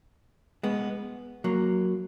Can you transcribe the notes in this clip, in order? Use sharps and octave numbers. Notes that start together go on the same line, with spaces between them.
G#3 B3
F#3 A#3